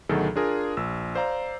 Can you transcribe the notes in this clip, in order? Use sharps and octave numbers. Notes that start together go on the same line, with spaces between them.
D2 B2 D#3 F#3 G#4 A4
D4 F4 G#4 A#4
A#1 E6
C5 D5 F5 A#5